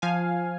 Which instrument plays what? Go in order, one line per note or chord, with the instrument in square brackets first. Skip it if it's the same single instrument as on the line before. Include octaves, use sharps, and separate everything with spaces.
[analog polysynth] F3 F5 G#5